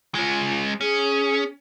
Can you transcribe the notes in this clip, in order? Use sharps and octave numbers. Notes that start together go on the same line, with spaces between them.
G#3 C#4 F4
C#4 G#4